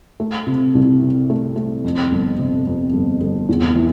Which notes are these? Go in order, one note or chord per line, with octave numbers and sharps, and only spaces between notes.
A3
C3
C2
C3
A3
A3
F2
G1
C3
F2
G1
G1
E2
E3